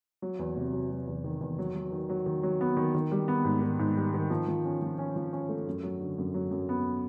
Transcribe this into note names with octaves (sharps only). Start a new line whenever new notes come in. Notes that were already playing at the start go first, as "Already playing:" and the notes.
F#3
E2
C3
F#3
F#3
E2
D#3
E2
F#3
F#3
D#3
F#3
D#3
F#3
B3
D#3
D#3
G3
B3
G#2
D#3
G#2
G3
D#3
F3
F3
C#4
F3
C#4
F3
C#4
A3
F#2
F#3
D3
F#2
F#3
F#2
B3